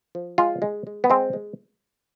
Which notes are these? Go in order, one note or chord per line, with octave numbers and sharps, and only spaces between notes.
F3
G#3 F4
G#3
G#3
B3
G#3 C4
G#3